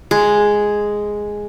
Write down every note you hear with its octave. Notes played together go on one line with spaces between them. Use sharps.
G#3